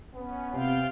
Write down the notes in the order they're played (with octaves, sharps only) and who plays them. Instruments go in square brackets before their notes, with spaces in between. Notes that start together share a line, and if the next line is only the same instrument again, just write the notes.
[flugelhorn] B3 [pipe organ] C#4
[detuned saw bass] C3 [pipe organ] F4 F5 G5